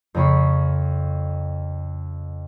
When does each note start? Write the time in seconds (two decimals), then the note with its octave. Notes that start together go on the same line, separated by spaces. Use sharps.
0.15 F2 C#3 A#3 F4 B5 C#6